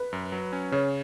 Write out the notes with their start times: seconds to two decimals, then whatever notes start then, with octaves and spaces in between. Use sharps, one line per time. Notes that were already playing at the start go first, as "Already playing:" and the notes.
Already playing: B4
0.13 F#2
0.32 F#3
0.53 C#4
0.72 C#3 C#5